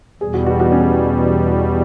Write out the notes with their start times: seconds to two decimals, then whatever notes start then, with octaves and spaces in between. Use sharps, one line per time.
0.21 E2 B2 G3 G#4
0.34 F#4
0.46 F#4
0.60 F#4
0.72 C#4